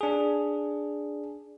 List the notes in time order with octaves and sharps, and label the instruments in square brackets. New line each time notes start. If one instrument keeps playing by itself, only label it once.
[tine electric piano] D4 G#4